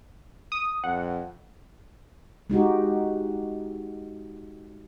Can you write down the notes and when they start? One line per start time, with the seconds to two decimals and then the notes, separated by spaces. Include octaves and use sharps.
0.52 D#6
0.84 F2 F#5
2.50 G#3 D#4 F#4 G4